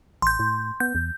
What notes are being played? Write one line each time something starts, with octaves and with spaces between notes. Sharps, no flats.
A1 C6 G6
A2
B3 G6
E2